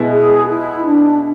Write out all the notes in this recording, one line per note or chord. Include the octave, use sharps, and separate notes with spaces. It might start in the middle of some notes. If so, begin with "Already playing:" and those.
Already playing: B2 G#3 B3 E4
G#4
E4
D4